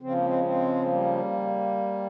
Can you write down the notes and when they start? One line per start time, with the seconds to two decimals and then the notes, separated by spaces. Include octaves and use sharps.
0.01 C#3 F3 C4
0.14 A#3
0.25 G#3 C4
0.44 G#3 C4
0.86 G3 A#3